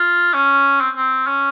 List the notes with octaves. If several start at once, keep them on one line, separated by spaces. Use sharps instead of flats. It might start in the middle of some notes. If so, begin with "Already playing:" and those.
Already playing: F4
C#4
C4
C4
C#4